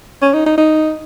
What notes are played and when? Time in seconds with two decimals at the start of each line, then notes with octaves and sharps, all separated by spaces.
0.22 C#4
0.34 D#4
0.46 D#4
0.58 D#4